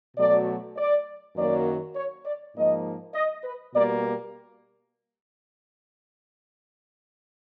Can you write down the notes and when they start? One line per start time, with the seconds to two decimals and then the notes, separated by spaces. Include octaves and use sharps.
0.17 B2 F#3 A3 D5
0.77 D5
1.36 F#2 D#3 F#3 A#3 D5
1.95 C#5
2.25 D5
2.55 G#2 F3 A#3 D#5
3.15 D#5
3.44 B4
3.74 B2 G3 A#3 D5